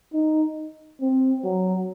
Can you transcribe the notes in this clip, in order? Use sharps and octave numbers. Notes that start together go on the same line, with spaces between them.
D#4
C4
F#3